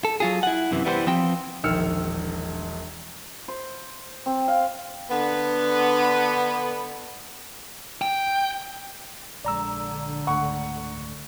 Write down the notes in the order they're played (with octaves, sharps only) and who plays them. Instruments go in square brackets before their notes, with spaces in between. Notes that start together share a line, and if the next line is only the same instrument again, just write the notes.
[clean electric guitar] A4
F#3 F4 G#4
E4 F#5
F#2 C3 E3
E3 G3 B3 A4 C5
F3 C4 G5
[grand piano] E1 A#1 D#3 E6 F6 C#7
[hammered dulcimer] C5
C4
F5
[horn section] D3 B3
[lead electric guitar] G5
[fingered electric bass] A#1 G#3 [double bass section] D3 [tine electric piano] D5 A#5 E6
[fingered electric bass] C#2 G#2 A3 [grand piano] F#5 C#6